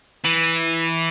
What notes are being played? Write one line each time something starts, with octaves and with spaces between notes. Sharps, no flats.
E3